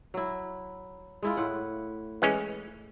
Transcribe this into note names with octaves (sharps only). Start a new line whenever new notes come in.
F#3 E4
G#3 E4 F4
A2 F#5
E3 G#3 C#4